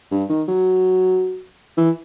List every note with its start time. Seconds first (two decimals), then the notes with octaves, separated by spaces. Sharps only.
0.11 G2
0.29 D#3
0.48 F#3
1.77 E3